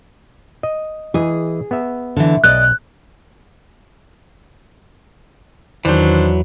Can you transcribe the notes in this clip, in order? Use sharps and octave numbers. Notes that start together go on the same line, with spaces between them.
D#5
E3 G#4 D#5
B3 E5
D3 E3
B1 D5 D#5 F#6
E2 D#3 E3 F#3 D4 C5